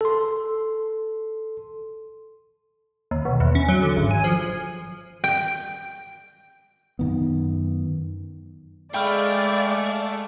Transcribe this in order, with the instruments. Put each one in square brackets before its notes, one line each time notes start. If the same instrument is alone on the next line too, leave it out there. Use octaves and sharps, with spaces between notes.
[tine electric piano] A4 C6
[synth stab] D#2
B1
E2
C#4
F#3
D3
G#1
G#5
F3
[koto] G5
[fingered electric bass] F#2 D#3 B3
[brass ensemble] G#3 [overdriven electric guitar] A3 [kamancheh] D5 F5 [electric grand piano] G5 B5 F6